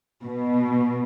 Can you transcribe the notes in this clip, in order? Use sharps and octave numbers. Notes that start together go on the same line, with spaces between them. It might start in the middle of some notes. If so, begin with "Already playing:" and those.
B2